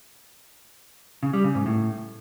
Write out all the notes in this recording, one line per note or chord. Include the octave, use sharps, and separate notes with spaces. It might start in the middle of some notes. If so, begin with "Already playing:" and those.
C#3
G3
C#3
G#2
A2